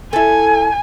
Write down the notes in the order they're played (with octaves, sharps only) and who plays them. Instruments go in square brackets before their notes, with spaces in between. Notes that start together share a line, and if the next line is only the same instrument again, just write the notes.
[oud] E4 A4 [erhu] G#5